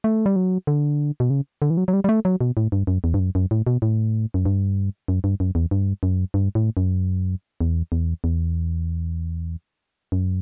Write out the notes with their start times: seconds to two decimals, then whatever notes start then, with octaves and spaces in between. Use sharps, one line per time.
0.04 A3
0.26 G3
0.36 F#3
0.67 D3
1.20 B2
1.30 C#3
1.62 D3
1.70 E3
1.77 F#3
1.88 F#3
1.93 G3
2.04 G3
2.09 A3
2.25 F#3
2.41 B2
2.57 A2
2.72 G2
2.87 F#2
3.04 E2
3.14 G2
3.19 F#2
3.35 F#2
3.51 A2
3.67 B2
3.82 A2
4.34 F#2
4.46 G2
5.08 F#2
5.24 G2
5.40 F#2
5.55 E2
5.71 G2
6.03 F#2
6.34 G2
6.55 A2
6.77 F#2
7.61 E2
7.92 E2
8.24 E2
10.12 F#2